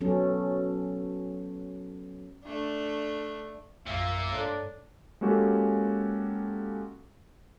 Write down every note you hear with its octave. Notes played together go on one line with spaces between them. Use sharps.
F#3 B3 C#4 A4
A3 D4
A#1 F#2 A#2 A#3 E5 B6
G2 D4 A4 C#5
G#3 A#3 C#4 F#4 G4 A4